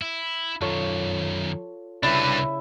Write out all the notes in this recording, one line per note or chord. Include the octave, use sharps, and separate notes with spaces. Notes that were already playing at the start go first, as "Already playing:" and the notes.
E4
F#2 D#3 F4 A4 C#5
C2 C#3 C4 D4 E4 B4 E5